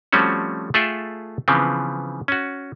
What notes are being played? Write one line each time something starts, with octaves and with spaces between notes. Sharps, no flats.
F3 G3 A3 C4 C#4 F#4
A3 F4 G#4 A4 E5 G5
C#3 E3 F3 B3 C4
C#4 F#4